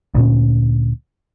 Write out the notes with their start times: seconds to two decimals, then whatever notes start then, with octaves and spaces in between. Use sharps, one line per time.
0.15 D2 A#2 C#4